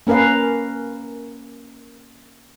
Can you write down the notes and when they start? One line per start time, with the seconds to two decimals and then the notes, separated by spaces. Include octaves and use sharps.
0.07 A#3 C#4 A#4 B4 F5